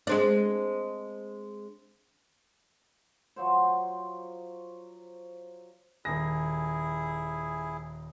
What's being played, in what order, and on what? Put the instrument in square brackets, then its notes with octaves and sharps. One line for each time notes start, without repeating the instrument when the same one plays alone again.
[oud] G#3 C4 D4
[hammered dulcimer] F3 F#3 C5
[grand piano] D#1 A#6 [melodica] E4 G#4